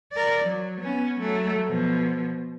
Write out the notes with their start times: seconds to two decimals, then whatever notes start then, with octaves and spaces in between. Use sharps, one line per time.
0.12 A#4 D5
0.43 F#3
0.80 B3 C#4
1.19 F#3 A3
1.67 B2 F3